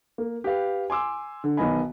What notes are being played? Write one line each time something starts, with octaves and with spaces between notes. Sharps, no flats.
A#3
G4 B4 F5
G#5 C6 D6 E6
D3
B1 D#3 B3 D#5 G#5 B5